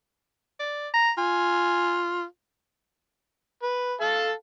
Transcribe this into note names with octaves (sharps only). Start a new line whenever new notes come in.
D5
A#5
F4 G#5
B4
A4 F5 A5